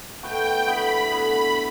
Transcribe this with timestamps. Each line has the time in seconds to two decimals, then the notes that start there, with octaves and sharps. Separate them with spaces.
0.22 B2 A3 E4 B4 G5
0.66 D3 B3 E4 B5
1.11 D3 B3 E4 B5